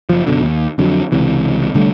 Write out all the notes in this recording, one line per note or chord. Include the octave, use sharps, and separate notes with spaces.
F#1 F3
F#1 B2 D3
D#2
F2 D3 F#3
C#2 C3 E3
C2 D3 G3 A3